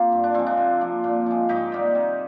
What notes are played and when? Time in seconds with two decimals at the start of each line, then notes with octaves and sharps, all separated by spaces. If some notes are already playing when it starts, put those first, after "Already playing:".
Already playing: A#3 C4 F4 G4 A#4
0.12 G2
0.24 D4
0.34 F3 G#3 C4
0.47 D4
0.57 C3
0.81 F3 A#3
1.04 A#2
1.26 F3 G#3
1.49 G#2 D#4 G4
1.72 D#3 G3 A#3
1.95 C3